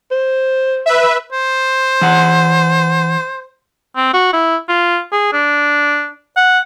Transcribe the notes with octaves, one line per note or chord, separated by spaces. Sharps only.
C5
B4 E5
C5
E3 F#5
C4
F#4
E4
F4
G#4
D4
F#5